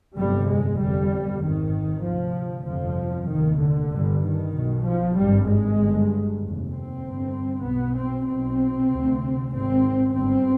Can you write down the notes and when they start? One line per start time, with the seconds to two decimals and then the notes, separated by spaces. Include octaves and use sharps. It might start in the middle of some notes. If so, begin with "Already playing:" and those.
0.17 G1 F2 C3 G3
0.47 G#3
0.78 G1 F2 C3 G3
1.41 G#1 G#2 D#3
2.03 D2 C3 F3
2.66 G1 F2 C3 F3
3.28 F1 D#2 D#3
3.59 D3
3.91 G1 G2
4.22 D#3
4.52 B1 B2
4.83 F3
5.15 G#1 G2 G3
5.47 G#3
5.77 G1 G2
6.40 F1 D#2
6.71 C4
7.02 G1 G2
7.64 B1 B2 B3
7.95 C4
8.27 B1 B2 C4
8.89 D2 C3
9.51 G#1 G#2 C4
10.13 G1 G2 C4